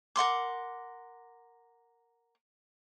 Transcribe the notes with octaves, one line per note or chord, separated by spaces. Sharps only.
A#4 F#5 C6 D6